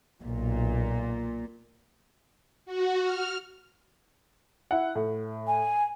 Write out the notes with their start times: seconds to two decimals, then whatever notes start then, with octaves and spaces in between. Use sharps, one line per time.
0.24 B1 A#2
2.66 F#4
3.02 F6
4.71 E4 F#5
4.95 A2
5.47 G#5